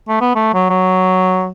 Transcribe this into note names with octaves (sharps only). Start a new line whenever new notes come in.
A3
B3
A3
F#3
F#3